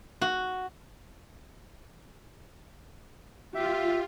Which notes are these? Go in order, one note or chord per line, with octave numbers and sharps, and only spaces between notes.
F#4
F4 G4 E5